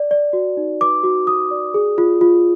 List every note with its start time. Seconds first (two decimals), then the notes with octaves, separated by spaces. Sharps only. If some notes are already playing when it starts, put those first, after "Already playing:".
Already playing: D5
0.11 D5
0.33 F#4
0.57 D#4
0.81 B4 D6
1.04 F#4
1.27 F#4 D#6
1.51 D5
1.74 G#4
1.98 F4
2.21 F4